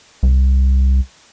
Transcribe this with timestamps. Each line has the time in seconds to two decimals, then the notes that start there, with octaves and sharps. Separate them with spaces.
0.23 C2